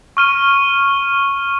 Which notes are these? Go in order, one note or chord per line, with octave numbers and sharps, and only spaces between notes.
C#6 F6 D#7